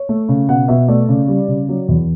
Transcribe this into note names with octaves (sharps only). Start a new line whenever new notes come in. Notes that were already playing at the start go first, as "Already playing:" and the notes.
Already playing: C#5
A3
C#3
B2 F#5
B2 E5
A3 D5
C#3
G3
C#3
F#3
E2